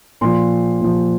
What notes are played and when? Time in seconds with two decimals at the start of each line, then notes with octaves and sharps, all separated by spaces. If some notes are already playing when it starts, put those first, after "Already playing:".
0.21 A#2 F3 C6
0.81 A#2 F3